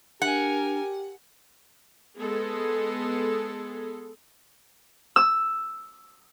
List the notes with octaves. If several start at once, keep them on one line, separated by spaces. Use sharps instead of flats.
D4 G4 A#4 F#5 G#5
G#3 B3 G#4 A4
E6